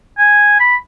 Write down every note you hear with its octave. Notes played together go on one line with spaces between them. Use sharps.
G#5
B5